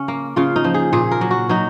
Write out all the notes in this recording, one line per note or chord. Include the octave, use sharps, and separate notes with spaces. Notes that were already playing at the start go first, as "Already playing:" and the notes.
Already playing: C#3 C#4
A#3
C#3 F4
D#4
F3
G#4
A#2 G#4
A#4
F#3
F#4
F#3 D#4